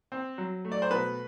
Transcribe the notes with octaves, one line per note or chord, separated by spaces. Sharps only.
C4
F#3
A3
D5
C5
B2 B4